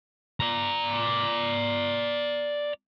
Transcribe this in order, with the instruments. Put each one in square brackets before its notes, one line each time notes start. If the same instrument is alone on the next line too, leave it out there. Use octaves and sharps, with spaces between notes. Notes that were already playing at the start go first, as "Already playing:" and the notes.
[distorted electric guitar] D5 A#5